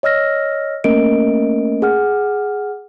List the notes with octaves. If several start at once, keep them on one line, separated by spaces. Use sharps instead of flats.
C#5 D#5 E6 F6 A#6
A3 A#3 C#4 A#4 D#5 D7
G#4 F#5 F6